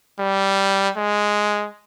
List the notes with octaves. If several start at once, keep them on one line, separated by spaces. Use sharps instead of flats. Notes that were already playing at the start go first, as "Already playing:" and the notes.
G3
G#3